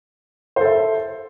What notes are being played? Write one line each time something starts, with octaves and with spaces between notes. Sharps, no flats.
A4 C5 E5